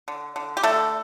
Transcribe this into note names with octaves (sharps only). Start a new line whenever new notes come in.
D3
D3
G4
D3 A3 A4